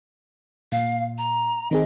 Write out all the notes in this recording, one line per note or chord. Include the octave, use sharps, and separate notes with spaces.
A#2 F5
A#5
D#3 C4 G#4 D#5